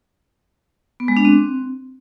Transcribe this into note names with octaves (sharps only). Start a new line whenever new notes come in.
B3
G#3
D4
C4